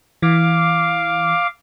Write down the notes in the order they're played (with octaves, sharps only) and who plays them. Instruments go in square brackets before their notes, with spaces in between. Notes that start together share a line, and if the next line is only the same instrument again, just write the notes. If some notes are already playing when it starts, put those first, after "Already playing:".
[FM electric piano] E3 [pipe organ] F5 D6